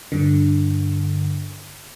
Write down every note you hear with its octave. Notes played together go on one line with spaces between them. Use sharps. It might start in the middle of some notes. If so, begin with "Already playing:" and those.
G2 D3